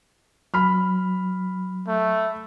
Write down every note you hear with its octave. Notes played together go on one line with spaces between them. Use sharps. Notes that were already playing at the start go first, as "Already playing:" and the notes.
F#3 B5 F6
A3